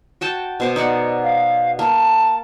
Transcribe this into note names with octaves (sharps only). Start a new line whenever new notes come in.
F#4 G5 A5
B2 C5 D6
D#4 D5 F#5
F5
A#3 A5